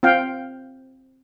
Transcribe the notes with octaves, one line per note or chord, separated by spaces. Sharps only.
C4 F4 F5 G5